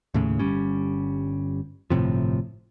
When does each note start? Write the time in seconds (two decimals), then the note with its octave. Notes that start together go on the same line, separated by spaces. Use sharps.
0.14 D#2 A2 C#3
0.39 G1 G3 C#4
1.90 G1 A2 C3 F3